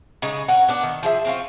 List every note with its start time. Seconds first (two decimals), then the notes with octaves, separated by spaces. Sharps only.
0.22 C#3 G#3 D#4 G#4
0.48 C#4 A#4 F#5
0.68 B3 D4
0.83 D#3
1.03 F3 G#4 E5
1.25 C4 C#4 F4